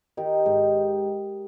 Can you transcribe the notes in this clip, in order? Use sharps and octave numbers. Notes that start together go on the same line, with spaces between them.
D#3 D#4 G4
G#2